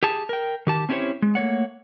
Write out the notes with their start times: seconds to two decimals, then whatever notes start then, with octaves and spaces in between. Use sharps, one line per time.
0.03 G4 G#4 A5
0.29 A#4 G5
0.67 D#3 G4 A5
0.89 C4 C#4 E4 G4 C5 C#5
1.22 G#3
1.35 A3 A#3 C#5 F#5